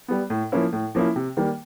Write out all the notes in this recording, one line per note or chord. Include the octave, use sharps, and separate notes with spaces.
G3 B3
A2
F3 A#3 C#4 E4
A2
F3 A#3 C#4 E4
C3
D#3 G3 A#3